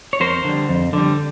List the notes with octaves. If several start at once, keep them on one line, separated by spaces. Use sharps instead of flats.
C#5
F2 A#4 C5
D3 G3
F2
D3 G3